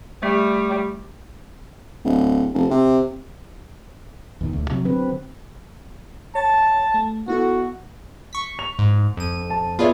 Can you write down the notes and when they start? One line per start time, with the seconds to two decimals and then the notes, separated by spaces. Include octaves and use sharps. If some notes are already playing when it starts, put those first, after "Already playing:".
0.23 G3 A3
2.05 D1
2.54 F1
2.71 C3
4.41 E2 B2 D#3
4.53 D2
4.70 C3 F3 F#3
4.85 D3 F#3 C4 B4
6.35 C#5 A5 A6
6.94 A3
7.28 B3 E4 F#4 A4
8.33 C#6 B6
8.59 F7
8.79 G#2
9.17 F2 D#7
9.50 A5
9.79 B3 F4 G#4 C#5 D5 E5